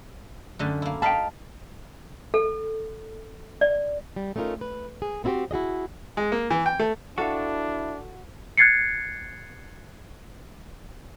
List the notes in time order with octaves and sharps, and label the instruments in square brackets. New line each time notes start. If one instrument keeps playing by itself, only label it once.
[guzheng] F#2 D3 A3
A#3 E4
[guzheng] D#4 F5 B5 [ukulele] G5 A5
[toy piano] A4
D5
[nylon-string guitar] G3
A3 C#4 D#4 F4 A#4
B4
G#4
B3 C4 E4 F#4 G4 C5
E4 F#4 G#4 D#5
[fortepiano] G#3
A#3
E3
G5
A3
[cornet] D4 [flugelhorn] E4 [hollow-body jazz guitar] F#4 [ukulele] A4 F5
[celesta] F#6 G#6 A6 C7 C#7